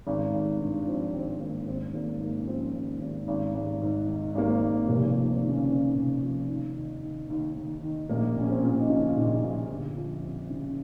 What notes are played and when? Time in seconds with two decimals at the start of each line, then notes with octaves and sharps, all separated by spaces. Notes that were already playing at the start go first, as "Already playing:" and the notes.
0.07 G#1
0.33 G#1
0.60 G2
0.87 F3 C4
1.13 G#1 C4
1.40 G#1 A#3
1.67 G#1 C4
1.94 G#1 A#3
2.21 G#2 A#3
2.38 C#4
2.47 F3 C4
2.74 G#1
3.01 G#1
3.28 G#1
3.55 G#1
3.81 G#2
4.08 D#3
4.35 G#1 A#3
4.48 C4
4.61 G#1
4.89 F1 A#3
5.08 A#3
5.15 F3
5.28 C4
5.42 D#2
5.48 C#3 C#4
5.68 C#3 C4
5.95 F1
6.22 F3
6.49 D#2
6.75 D#3
7.03 D#3
7.29 D#2
7.55 D#2
7.83 D#3
8.09 A#1 A#3
8.36 A#1
8.41 C#4
8.49 C4
8.63 A#2
8.79 D#4
8.89 C#3 F3 C#4
9.08 F4
9.16 A#1 D#3 D#4
9.43 A#1 F3 F4
9.70 G1
9.97 F3
10.23 F2
10.50 C#3